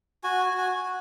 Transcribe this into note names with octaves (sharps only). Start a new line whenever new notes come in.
F#4 G#5
F#4
G#5
F#4